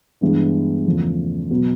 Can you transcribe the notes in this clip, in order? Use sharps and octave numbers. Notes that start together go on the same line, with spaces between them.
G2 E3 G#3 B3 D4
E2 C#3 F3 A3
B2 F#3 B3